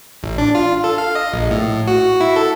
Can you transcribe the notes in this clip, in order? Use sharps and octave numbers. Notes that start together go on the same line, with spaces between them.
A1
D4
F4
A4
F5
D#5
A#1
A2
F#4
E4
A4